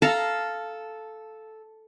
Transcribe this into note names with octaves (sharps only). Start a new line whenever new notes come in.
A4 F5 A5 A#5